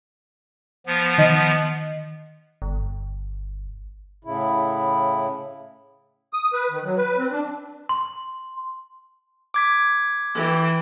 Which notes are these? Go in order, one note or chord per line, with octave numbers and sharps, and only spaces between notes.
F3 B3
D#3 D#5
G1
A2 C#3 E4
D#6
B4
D#3
F#3
B4
C4
D4
C6
D6 G#6 B6
E3 G5